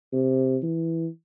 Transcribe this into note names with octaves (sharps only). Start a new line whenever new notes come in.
C3
E3